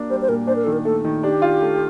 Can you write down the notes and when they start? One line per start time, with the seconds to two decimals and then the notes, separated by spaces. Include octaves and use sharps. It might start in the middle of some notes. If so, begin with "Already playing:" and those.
Already playing: A#3 D4
0.10 G3 C5
0.21 C5
0.29 A#2 A#4
0.47 D4 C5
0.55 A#4
0.64 D#3 A4
0.72 A#4
0.85 A3 A4
1.04 D#3
1.23 D4 G4
1.42 F4
1.61 A3